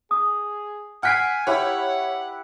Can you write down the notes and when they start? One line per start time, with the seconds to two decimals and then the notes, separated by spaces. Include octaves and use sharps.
0.11 G#4 D#6
1.03 F#5 G#5 F6 F#6 B6 C7 D7
1.47 E4 G4 B4 C#5 F#5